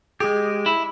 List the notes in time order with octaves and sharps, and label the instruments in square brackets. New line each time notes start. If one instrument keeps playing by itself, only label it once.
[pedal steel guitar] G#3 G4 [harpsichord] G#4
[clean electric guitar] E4